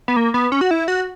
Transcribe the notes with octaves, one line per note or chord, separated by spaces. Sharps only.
B3
A#3
B3
C#4
F#4
E4
F#4